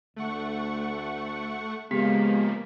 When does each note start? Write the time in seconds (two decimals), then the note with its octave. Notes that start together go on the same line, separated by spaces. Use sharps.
0.16 D2 A3 F#5 C#6
1.91 C#3 F3 G#3 A#3 B3 G4 B6